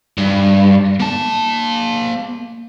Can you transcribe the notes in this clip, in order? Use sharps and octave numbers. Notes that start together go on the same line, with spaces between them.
G2
A#3 A5